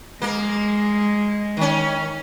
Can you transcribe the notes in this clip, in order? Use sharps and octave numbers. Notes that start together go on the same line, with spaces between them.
G#3 A#3 A#4
D#3 C#4